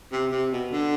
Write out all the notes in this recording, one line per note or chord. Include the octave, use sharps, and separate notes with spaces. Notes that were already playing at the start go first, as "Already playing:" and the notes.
C3
C3
B2
D3